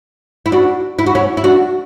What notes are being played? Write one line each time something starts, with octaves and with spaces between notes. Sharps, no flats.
E4
D4 F#4
E4
F#4
C#4 E4
E4
D4 F#4